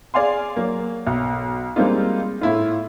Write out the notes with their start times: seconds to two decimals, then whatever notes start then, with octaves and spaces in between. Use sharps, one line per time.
0.14 G#4 D5 F5 G#5 C6
0.56 F#3 A#3
1.07 B1
1.76 G3 G#3 A#3 C4 D#4 F4
2.41 A2 E4 F4